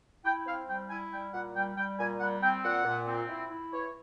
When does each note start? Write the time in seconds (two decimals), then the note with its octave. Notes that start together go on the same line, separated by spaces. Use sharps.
0.24 E4 G5
0.46 C4 F5
0.68 G3 G5
0.89 E4 G#5
1.11 G3 G5
1.33 A#2 F#5
1.55 G3 G5
1.76 G3 G5
1.98 A#2 G#5
2.20 G3 F#5
2.42 C4 G5
2.64 A#2 F#5
2.85 A#2
3.06 C4
3.29 E4
3.50 E4
3.72 E3 C#5